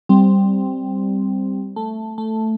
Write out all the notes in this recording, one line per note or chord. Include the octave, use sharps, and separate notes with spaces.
G3 C4
A3
A3